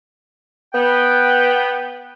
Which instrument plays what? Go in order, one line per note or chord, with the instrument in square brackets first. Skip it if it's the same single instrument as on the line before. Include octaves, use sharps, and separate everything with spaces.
[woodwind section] B3 G5